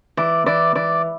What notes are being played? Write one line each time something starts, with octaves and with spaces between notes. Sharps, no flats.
E3 D5
E3 D5
E3 D5